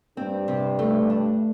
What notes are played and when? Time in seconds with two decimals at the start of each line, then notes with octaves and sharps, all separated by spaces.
0.17 G2 C4
0.48 C3
0.79 A3
1.10 D4